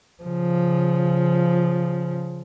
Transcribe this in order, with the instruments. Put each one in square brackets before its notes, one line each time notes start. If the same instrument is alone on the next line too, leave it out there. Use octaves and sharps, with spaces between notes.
[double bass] C#3 F3